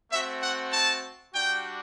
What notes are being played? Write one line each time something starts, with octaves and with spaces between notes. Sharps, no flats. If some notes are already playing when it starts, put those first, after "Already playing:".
A3 C4 F#4 E5
F#5
A5
G3 D4 F#4 G5